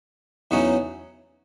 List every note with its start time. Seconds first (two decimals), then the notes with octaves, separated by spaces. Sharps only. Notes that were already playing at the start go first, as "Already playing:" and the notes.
0.51 E2 C#3 F#3 C#4 D#4